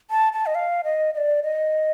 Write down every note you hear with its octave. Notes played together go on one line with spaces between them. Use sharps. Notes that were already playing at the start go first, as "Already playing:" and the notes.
A5
A5
D#5
F5
D#5
D#5
D5
D#5